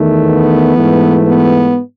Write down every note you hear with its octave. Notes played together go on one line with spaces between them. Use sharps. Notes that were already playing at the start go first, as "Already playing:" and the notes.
Already playing: E2 D#3 A3
B3
G#2 E3 A3
B3